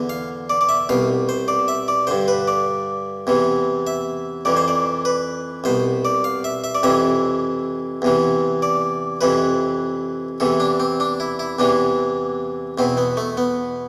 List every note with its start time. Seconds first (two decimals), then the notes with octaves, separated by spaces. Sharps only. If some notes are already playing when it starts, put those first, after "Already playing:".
Already playing: E2 D3
0.09 F5
0.50 D5
0.61 D5
0.69 E5
0.89 C2 B2 F5
1.29 C5
1.48 D5
1.68 E5
1.88 D5
2.07 G2 D3 C5
2.28 B4
2.48 D5
3.27 E2 C3 E3
3.87 E5
4.45 F2 E3 D5
4.57 C5
4.68 D5
5.05 B4
5.64 C2 B2 C5
6.05 D5
6.24 F5
6.44 E5
6.64 E5
6.75 D5
6.83 F2 C3 E3 E5
8.02 E2 C3 E3
8.62 D5
9.21 F2 C3 E3 B4
10.40 E2 C3 E3 A4
10.60 D4
10.80 C4
11.00 D4
11.20 E4
11.39 E4
11.59 E2 C3 E3 D4
12.78 E2 B2 C4
12.97 B3
13.17 A3
13.37 B3